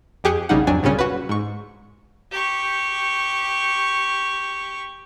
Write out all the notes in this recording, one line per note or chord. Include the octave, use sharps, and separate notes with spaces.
F2 G4 G#4 F#6 C#7
A#1 C#3 G3 D#4 F#5
G#1 F2 F#3 D4 G#5
C#2 A#2 C#3 G3 C#4
F#4 B4
G#2 C#6
G4 C#6